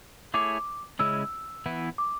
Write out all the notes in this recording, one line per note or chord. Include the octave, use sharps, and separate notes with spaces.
A3 E4 G#4 C#5 D6
C#3 G#3 C#4 E4 E6
E3 B3 E4
D6